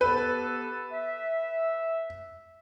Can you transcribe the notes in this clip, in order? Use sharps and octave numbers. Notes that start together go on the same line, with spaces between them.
B3 G4 A4 B4
E5